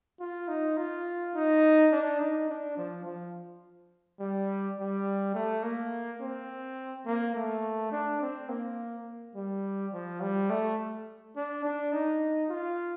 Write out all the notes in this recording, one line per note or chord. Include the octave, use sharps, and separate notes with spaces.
F4
D#4
F4
D#4
D4
D#4
D4
F3
F3
G3
G3
A3
A#3
C4
A#3
A3
D4
C4
A#3
G3
F3
G3
A3
D4
D4
D#4
F4